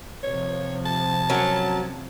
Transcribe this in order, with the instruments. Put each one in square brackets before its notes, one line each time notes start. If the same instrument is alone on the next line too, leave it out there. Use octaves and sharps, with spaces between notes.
[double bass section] C3 F3 [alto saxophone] C#5
[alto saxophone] A5
[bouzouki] F#3 C#4 A#4